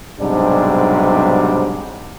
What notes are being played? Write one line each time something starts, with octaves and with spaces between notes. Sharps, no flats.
B1 G#2 C3 F#3 G3 D4